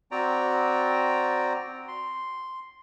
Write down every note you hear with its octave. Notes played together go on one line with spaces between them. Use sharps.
C4 F#4 D5 G5 A#5
C6